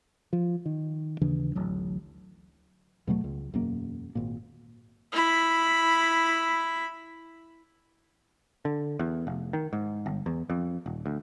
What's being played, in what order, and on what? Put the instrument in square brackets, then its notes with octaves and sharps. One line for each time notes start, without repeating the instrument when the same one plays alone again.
[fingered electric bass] F3
D#3
D#2 C#3 E3 D4
D1 A1 F#3
E2 B2 F#3 A3
C#2
E1 F#2 A#3
G#1 A#2
[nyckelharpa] E4 B5
[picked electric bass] D3
E2
F1
D#3
G#2
G1
E2
F2
D#1
D2